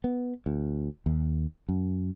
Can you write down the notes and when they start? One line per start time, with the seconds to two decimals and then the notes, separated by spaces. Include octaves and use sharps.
0.04 B3
0.46 D2
1.06 D#2
1.69 F#2